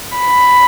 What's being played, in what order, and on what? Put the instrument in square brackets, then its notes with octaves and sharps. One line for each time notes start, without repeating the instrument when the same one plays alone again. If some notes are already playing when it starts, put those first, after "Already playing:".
[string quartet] B5